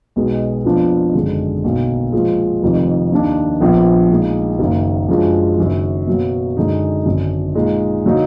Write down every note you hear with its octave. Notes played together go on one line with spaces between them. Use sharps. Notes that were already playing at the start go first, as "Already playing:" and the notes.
B1 B2 G#3 B3
F2 F3 B3 D4
G#1 F#2 D3 G#3
B1 B2 A#3
A#2 F3 G#3
F1 F2 D#3
D#2 D#3 A#3 D4
A#1 A#2 F3 B3
A#2 G#3 D#4 G#4
F#1 F#2 D#3 A#3
F#2 F3 G#3 D4 G#4
F#1 F#2 D#3
B2 F#3 A#3
F#2 D3 G#3 D#4
G#1 F#2 D3
A#2 G#3 D#4
D3 F#3 A#3 D#4